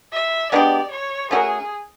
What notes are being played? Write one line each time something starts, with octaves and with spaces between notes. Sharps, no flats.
E5
G#3 B3 D4 G4 D5
C#5
A3 C#4 F#4 G#4 A#4